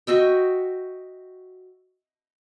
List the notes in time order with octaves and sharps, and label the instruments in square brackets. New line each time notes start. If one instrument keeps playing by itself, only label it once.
[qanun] F#4 D#5 E5 G5